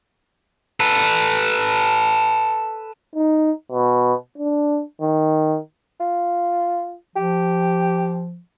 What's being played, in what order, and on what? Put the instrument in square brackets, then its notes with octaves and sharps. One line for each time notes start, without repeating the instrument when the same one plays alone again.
[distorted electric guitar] A4 B4
[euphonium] D#4
B2
D4
D#3
[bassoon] F4
[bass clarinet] F3 [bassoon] G4